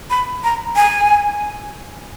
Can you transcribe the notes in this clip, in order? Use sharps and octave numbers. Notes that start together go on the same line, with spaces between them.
B5
A#5
G#5